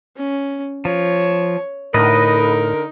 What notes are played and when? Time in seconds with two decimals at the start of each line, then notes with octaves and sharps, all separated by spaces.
0.16 C#4
0.85 F3 C#5
1.94 A2 D3 D#4 A#4 B4 D#5